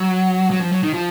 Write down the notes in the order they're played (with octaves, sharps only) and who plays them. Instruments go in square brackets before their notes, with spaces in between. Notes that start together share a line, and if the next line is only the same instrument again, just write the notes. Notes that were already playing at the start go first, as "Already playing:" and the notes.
Already playing: [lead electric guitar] F#3
F#3
F3
F#3
D#3
F3